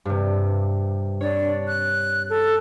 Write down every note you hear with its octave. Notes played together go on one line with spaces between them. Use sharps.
G2 C3
D4 C#5
F#6
A4